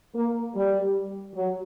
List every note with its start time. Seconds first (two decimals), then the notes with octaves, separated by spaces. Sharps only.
0.14 A#3
0.55 G3
1.34 F#3